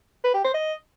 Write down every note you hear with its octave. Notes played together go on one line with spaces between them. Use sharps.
B4
G4
C5
D#5